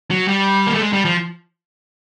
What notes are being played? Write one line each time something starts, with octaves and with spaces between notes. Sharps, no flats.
F#3
G3
A#3
A3
G#3
G3
F3